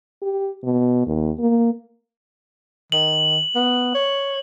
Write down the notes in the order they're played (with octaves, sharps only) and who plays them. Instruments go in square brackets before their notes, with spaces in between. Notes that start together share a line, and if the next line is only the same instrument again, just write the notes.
[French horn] G4
B2
D#2
A#3
[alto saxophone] D#3 [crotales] F#7
[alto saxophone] B3
C#5